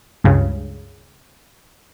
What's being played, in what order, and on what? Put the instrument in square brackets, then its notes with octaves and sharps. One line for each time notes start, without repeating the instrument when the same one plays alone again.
[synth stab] C#2 G2 C#3